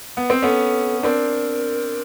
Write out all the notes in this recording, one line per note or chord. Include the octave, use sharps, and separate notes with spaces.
B3
C4
B3 C#4 A4
C4 D4 A#4